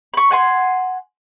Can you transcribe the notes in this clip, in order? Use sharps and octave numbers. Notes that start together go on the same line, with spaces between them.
B5 C#6
F#5 G#5 C6